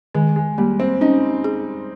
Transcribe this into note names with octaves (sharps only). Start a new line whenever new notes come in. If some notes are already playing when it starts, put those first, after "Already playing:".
D#3 G#3
G#3
G3 A#3
C4
C#4 D#4
G#4